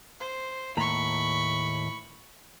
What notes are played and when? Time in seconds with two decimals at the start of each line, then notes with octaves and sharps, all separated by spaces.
0.20 C5
0.77 D#2 A2 A#5 B5 C#6